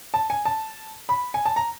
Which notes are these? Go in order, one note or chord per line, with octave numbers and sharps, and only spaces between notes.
A5
G#5
A5
B5
G#5
A5
A#5